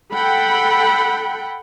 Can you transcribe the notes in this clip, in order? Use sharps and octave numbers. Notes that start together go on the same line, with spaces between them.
A4 F#5 G5 B5